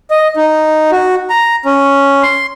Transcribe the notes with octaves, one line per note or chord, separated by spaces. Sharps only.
D#5
D#4
F#4
A#5
C#4
C6